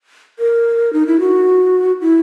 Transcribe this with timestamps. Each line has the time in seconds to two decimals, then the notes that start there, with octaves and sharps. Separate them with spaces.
0.39 A#4
0.93 D#4
1.07 E4
1.20 F#4
2.01 E4